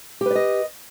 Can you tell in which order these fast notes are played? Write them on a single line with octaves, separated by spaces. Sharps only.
G4 B4 D5 D#5